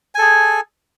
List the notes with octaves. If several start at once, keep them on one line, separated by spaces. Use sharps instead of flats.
G#4 A4 G#5